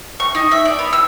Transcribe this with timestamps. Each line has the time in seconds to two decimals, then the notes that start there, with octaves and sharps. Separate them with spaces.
0.20 C#6
0.35 D#4
0.51 E5
0.65 D5
0.79 B3
0.93 E6